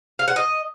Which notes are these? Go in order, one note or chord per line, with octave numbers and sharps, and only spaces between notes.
F5
F#5
D#5